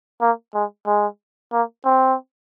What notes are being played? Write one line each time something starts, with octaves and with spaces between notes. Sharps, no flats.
A#3
G#3
G#3
A#3
C4